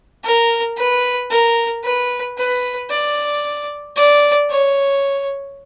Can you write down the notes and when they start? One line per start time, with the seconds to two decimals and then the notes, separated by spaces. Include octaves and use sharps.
0.24 A#4
0.77 B4
1.30 A#4
1.83 B4
2.37 B4
2.90 D5
3.96 D5
4.50 C#5